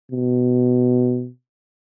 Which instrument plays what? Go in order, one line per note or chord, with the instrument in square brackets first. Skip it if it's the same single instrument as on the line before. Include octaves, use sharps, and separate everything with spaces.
[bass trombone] B2